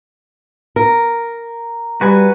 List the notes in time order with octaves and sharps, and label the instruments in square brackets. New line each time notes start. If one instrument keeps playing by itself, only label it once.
[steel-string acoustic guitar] A#4
[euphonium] G3 [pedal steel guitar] F#4 B4 G#5